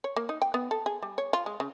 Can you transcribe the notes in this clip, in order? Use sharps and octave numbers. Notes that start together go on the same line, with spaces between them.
C#5
A#3
D#4
G5
B3
A4
G#4
G3
C#5
F4
G#3
C#3